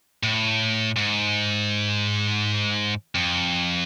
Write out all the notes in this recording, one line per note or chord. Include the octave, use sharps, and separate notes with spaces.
A2
G#2
F2